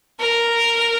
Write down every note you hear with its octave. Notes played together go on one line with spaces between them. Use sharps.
A#4